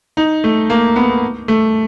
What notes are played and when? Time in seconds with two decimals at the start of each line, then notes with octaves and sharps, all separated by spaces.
0.17 D#4
0.44 A3
0.70 A#3
0.96 B3
1.48 A3